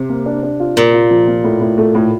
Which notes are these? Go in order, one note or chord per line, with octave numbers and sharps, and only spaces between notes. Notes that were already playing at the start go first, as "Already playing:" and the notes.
Already playing: C3
A#3
D4
D4
F4
A#2 A#3
F4
F3
A#3
A2
A2
A3
A2